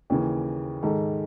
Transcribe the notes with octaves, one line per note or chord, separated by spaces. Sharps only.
D#2 C#3 E3
G#2 D#3 G#3 A4